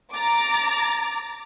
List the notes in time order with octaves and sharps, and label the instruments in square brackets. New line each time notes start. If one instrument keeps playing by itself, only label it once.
[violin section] A#5 D6 A6